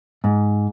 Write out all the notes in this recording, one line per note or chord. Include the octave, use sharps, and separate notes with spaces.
G#2